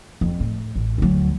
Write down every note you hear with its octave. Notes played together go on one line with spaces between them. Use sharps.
F2
A2
A1
D2 F#3